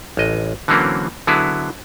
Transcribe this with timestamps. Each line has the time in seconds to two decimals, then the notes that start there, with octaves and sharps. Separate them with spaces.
0.17 A1 D#5
0.68 D3 E3 F#3 A#3 C4 C#4
1.27 D3 F#3 B3 E4 G#4